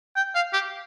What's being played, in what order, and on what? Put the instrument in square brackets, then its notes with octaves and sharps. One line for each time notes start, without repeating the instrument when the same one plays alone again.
[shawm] G5
F5
G4